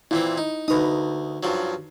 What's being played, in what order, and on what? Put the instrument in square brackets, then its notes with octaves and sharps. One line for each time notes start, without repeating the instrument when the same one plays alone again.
[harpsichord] A#2 E3 C4 [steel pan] E4
[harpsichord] D#4
[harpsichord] D2 A#5 D#6 [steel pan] D#4 B4
[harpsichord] G2 F3 F#3